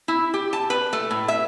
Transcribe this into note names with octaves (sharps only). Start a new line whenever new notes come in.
E4
G4
A5
B4
A3
A2
E5